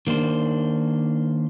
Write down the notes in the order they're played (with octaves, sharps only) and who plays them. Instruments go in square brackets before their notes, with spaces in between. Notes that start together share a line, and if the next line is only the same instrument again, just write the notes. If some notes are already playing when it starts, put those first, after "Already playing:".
[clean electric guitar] D#3 A#3 D4 C5